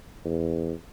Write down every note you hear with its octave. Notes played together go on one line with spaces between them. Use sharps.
E2